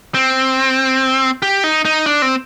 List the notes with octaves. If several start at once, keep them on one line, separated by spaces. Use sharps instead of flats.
C4
G4
D#4
D#4
D4
C4